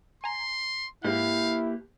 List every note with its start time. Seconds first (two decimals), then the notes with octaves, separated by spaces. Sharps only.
0.24 G#5 A#5 C6
1.04 G#2 A#3 E4 G4 B4 F5